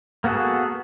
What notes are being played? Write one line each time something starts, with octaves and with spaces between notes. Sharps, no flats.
A#3 B3 F#4 G#4 A4